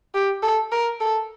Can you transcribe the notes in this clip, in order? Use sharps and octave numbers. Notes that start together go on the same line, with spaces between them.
G4
A4
A#4
A4